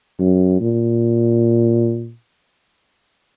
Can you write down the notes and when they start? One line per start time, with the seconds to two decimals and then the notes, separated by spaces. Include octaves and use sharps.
0.19 F#2
0.61 A#2